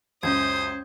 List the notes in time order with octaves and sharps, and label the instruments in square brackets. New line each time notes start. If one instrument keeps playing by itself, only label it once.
[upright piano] C#2 F#2 [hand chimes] C#4 G6 G#6 [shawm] C5 [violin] D#6